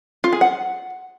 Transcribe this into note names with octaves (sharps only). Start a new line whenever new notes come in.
F4
G#4
F#5